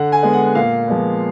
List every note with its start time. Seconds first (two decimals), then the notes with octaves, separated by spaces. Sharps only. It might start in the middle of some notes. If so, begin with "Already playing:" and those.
Already playing: D3 F#5
0.12 G#5
0.23 G#3 B3
0.33 F#5
0.45 F#5
0.55 A#2 F5
0.88 F3 G#3 B3